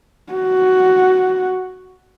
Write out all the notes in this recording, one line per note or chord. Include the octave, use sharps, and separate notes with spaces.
F#4